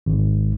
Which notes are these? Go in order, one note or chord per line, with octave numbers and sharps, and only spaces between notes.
G#1